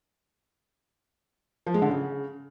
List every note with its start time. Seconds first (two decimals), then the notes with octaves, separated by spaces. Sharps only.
1.67 F3
1.74 G#3
1.82 D3
1.90 C#3